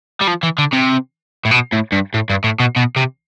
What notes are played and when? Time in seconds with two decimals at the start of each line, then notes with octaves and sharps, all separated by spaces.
0.21 G3
0.27 F3
0.43 E3
0.58 D3
0.73 C3
1.45 A2
1.51 B2
1.73 A2
1.92 G2
2.14 A2
2.30 G2
2.44 A2
2.60 B2
2.76 B2
2.96 C3